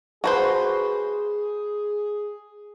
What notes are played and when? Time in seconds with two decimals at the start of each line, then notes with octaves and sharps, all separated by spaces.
0.24 F#4 G#4 B4 C5